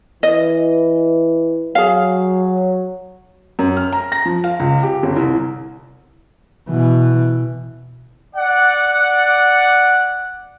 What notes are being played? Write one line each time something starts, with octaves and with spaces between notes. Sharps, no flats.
E3 D#5
F#3 G#4 F5
F#2
F6
A#5
A#6
F3
F5
C#2
G4
G1
C2
B2 E3
D5 F#5